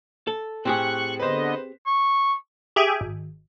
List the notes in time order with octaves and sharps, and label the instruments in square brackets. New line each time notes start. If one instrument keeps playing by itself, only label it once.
[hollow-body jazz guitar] A4
[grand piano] A2 [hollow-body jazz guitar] C4 G4 G#4 [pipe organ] C#6 F#6
[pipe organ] D3 B3 D#5 [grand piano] B4 C5
[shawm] C#6
[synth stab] G4 G#4 E5 G5 G#5
G#1